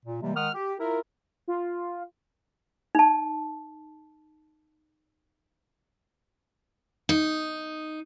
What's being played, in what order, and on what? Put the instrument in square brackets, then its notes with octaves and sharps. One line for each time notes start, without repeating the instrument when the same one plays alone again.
[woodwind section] A#2
C3 E3 G3 G#3 A#3
D#3 G#3 F#5 D#6 F6
G4
E4 F4 A#4
[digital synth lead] F4
[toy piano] D#4 A5
[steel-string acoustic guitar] D#4